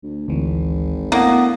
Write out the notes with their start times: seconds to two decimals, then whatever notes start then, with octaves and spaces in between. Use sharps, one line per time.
0.03 D2
0.28 G#1 D2 E3
1.12 A2 A#3 B3 D4